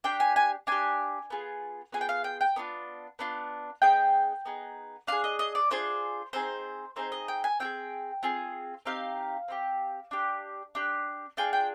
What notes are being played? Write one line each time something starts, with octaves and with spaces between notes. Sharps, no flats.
D4 G4 G5
G#5
G#5
D4 G4 G#5
B3 F4 G#4
B3 F4 G#4 G#5
G5
F5
G5
G5
B3 D4 F4
B3 D4 F4
B3 D#4 G#4 G5
B3 D#4 G#4
D4 F4 G#4 F5
D#5
D#5
D5
D4 F4 G#4 C5
C4 D#4 G#4 C5
C4 D#4 G#4 C5
D#5
G5
G#5
C4 F4 G#4 G5
C4 F4 G#4
C4 D#4 G4 F5
C4 D#4 G4
D4 G4
D4 G4
D4 F4 G#4 G5
G5